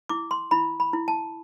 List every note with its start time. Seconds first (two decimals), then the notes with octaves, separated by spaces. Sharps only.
0.09 E4 D6
0.31 C6
0.51 E4 B5
0.80 B5
0.93 E4
1.08 A5